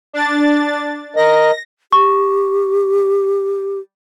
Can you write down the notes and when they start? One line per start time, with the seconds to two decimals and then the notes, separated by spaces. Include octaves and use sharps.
0.13 D4 A6
1.16 A#4 D#5 A#6
1.93 G4 C#6